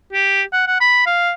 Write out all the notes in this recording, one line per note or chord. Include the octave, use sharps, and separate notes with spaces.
G4
F#5
F#5
B5
F5